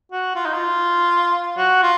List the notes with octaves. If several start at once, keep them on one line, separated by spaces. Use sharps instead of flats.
F#4
F4
D#4
F4
F#4
F4